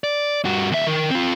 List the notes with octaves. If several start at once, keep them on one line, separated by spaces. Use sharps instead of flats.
D5
G2 F#4
D#2 E5
D#3
C4 F4